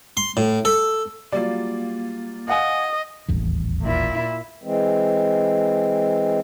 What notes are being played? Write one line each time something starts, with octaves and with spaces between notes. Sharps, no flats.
C6
A2
A4
F#3 G3 A#3 F4 D5
D#5 F5 F#5 G#5
D#1 A1 E2
A#2 E4
E3 G#3 C4